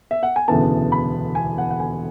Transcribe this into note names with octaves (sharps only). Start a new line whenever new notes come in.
E5
F#5
G#5
E1 D2 C#3 E3 B3 A5
B5
G#5
F#5
F#5
G#5